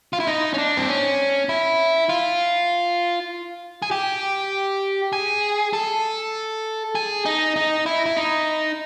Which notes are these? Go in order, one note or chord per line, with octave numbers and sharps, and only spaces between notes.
F4
E4
D#4
C#4
D4
C4
C#4
E4
F4
G#4
G4
G#4
A4
G#4
D#4
D#4
E4
E4
D#4